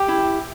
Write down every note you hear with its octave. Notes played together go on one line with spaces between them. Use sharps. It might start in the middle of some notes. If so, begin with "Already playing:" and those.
Already playing: G4 G5
E4